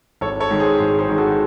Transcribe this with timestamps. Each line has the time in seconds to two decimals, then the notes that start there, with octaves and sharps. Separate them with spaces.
0.21 G#1 A4 C#5
0.40 A4 C#5
0.50 G#2 D#3 G#3
0.60 G#4 C5
0.79 G#1 G#4 C5
0.99 G#4 C5
1.08 G#2 D#3 G#3
1.18 F#4 A4